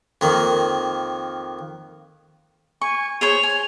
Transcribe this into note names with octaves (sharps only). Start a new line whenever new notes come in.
F2 D#3 A#3
G#5 C#6
G#4 C5 C#5 F7
G#5